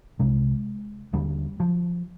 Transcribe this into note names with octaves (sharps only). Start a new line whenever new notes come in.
C2 C3 G#3
D#2 D3 G3
F3